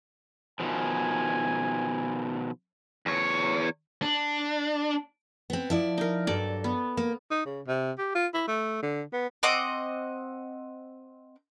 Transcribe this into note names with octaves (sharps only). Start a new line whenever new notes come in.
B2 D#3 F3 G#5
E2 C#5
D4
B3 C4
F3 E4 D5
D#4 A#4
G2 F#3 A4 D5 D6
B3
A#3
D#4
C#3
C3
G4
F4
E4
A3
D3
B3
C4 D#5 F#5 D6